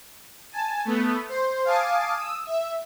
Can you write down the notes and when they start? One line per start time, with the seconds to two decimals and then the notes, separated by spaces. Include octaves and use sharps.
0.52 G#5 A5
0.85 A3 B3
1.29 C5
1.65 F5 G#5 A5 D6 D#6
2.14 D#6 E6
2.47 E5